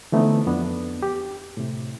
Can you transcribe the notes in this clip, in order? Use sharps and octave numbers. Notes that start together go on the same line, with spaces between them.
D3 E3 A3 B3 C4 D#4
F2 B3 D4
G4
A2 C3